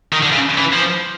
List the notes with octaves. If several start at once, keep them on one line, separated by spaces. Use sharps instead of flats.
D#3
D3
C#3
E3
F3